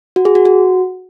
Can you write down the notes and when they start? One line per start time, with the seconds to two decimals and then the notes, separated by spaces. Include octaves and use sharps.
0.16 F#4
0.25 G#4
0.35 F#4
0.45 F#4